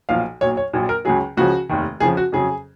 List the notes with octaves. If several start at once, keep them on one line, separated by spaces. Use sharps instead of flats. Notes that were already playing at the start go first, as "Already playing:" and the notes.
B1 A#2 F3 F5
B1 A#2 F#3 C#5
C#5
A#1 A#2 F#3
A#4
C#2 C#3 F#3 G#4
C#2 C#3 F3 F#4
F1 D#2 D#3
F2 C#3 F3 G#4
F#4
F2 C#3 F#3 G#4